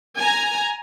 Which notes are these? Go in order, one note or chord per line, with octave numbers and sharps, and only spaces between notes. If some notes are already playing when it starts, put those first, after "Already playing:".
G#5 A#5